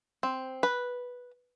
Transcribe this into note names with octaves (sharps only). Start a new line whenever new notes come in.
C4
B4